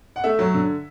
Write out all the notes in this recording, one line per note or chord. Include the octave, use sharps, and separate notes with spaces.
F#5
A3 E5
F#3
D3